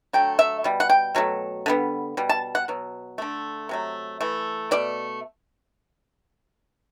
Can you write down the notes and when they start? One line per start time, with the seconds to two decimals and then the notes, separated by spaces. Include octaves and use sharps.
0.13 D3 F#3 A3 G5
0.39 E5
0.64 B2 G3
0.80 F#5
0.90 G5
1.15 B2 F#3 A3
1.66 D3 G3 B3
2.17 B2 G3
2.29 A5
2.55 F#5
2.68 B2 F#3
3.18 D3 A3
3.69 C3 F#3 A3
4.21 E3 A3
4.71 B2 A3 D5